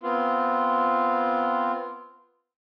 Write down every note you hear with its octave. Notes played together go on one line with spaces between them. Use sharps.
B3 C4 F4